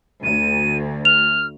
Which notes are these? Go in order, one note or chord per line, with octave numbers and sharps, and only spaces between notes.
D2 D#7
F6 F7